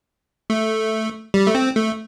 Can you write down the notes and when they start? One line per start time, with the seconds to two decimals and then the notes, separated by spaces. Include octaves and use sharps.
0.50 A3
1.34 G3
1.47 A3
1.55 C4
1.76 A3